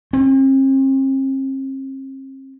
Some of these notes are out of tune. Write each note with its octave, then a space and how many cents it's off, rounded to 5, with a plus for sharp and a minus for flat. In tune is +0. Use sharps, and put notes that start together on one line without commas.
C4 +45